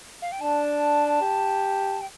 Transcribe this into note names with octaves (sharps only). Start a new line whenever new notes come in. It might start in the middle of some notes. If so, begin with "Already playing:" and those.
F5
G5
D4 A5
G4
G5